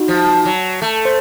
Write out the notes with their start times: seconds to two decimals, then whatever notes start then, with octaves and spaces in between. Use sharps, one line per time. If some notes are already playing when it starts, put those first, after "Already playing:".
Already playing: D#4 F#4
0.08 F3
0.45 F#3
0.82 A3
1.05 C5